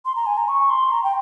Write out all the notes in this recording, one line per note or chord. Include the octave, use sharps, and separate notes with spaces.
C6
A#5
G#5
A#5
C#6
C6
A#5
G5